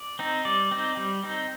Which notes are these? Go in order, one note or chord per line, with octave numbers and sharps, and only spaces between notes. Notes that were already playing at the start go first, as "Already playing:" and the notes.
Already playing: D5
C4 D#4
G3 D5
C4 D#4
G3
C4 D#4